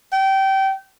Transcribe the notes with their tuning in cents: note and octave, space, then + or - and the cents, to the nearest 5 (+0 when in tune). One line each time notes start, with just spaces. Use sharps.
G5 -25